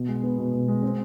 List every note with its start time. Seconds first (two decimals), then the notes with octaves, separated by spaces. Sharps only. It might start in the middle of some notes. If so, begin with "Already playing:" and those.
Already playing: B2
0.09 G#3
0.23 B3
0.38 B2
0.53 B2
0.68 G#3
0.83 C4